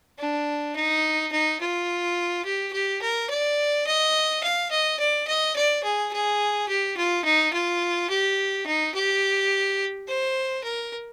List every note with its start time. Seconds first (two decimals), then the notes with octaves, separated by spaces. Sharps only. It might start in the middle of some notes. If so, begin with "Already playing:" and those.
0.19 D4
0.76 D#4
1.32 D#4
1.60 F4
2.45 G4
2.73 G4
3.02 A#4
3.30 D5
3.87 D#5
4.43 F5
4.71 D#5
4.99 D5
5.27 D#5
5.56 D5
5.83 G#4
6.13 G#4
6.68 G4
6.97 F4
7.25 D#4
7.53 F4
8.10 G4
8.67 D#4
8.95 G4
10.08 C5
10.64 A#4